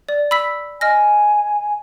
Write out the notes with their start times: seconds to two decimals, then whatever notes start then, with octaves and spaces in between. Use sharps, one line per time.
0.09 D5
0.31 B5 E6 B6
0.81 D#5 G#5 F6 A#6